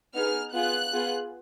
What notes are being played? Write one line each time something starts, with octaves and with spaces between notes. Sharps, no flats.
B3 D#4 G#4 F6
B3 F4 G#4 F#6
B3 F4 G#4